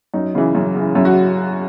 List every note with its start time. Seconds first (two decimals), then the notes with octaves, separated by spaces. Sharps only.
0.14 F#2 D#4
0.35 C#3 E3
0.55 F#2
0.75 C#3 E3
0.95 F#2 E4
1.05 F#4